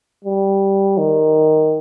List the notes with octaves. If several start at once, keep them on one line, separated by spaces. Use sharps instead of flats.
G3
D#3